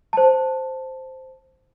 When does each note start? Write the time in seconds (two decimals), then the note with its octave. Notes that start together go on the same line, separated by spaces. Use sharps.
0.13 C5 A5